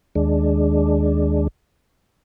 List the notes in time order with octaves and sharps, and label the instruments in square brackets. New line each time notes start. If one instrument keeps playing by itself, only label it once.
[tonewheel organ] D#2 G#3 D4